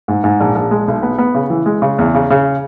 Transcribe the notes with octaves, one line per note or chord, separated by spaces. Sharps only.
G#2
G#2
A#1
A#1
G#3
B1
B3
B3
C#3
E3
G#3
C#3
E2
C#3
C#3